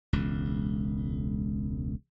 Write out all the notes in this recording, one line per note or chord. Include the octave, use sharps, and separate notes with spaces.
E1 C#2